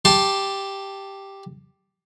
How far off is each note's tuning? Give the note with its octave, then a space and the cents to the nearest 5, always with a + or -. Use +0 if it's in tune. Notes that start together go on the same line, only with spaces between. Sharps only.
G4 +0 A5 +0 C6 +25